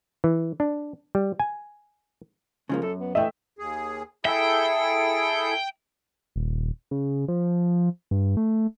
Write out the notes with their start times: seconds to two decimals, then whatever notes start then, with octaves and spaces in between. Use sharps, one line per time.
0.24 E3
0.60 D4
1.15 G3
1.40 G#5
2.69 C#3 F3 G#3 A#3
2.82 F#2 A4
2.99 B3
3.15 E3 A3 D#5 E5 G5
3.58 D#2 G#4
4.25 E4 G#4 A4 E5 G5 E6
6.36 D#1
6.91 C#3
7.28 F3
8.11 G2
8.37 A3